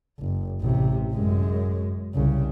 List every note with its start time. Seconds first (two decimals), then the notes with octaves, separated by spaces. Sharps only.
0.20 F#1
0.62 A1 C3
1.14 F#2 G#3
2.15 C2 C#3